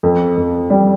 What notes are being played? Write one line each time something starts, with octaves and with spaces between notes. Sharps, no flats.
F2
F2
G3